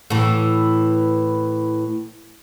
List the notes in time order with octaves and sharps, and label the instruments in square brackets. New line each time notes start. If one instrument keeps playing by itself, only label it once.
[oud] A2 E3